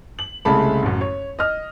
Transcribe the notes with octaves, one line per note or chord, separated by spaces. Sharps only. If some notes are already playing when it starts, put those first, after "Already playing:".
F#7
C2 C#3 G#3 A3 A5 B5
A1 F#2
C#5
D#5 F6